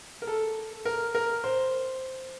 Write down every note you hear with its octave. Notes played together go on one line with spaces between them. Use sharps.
A#4
A4
A#4
A#4
C5